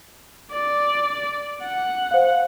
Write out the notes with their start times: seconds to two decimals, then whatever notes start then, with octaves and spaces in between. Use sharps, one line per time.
0.51 D5
1.62 F#5
2.11 C5 F5